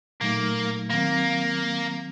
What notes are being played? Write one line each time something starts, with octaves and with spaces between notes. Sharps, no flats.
A#2 F#3 A3 A#3 D#4
D#3 F#3 A#3 C4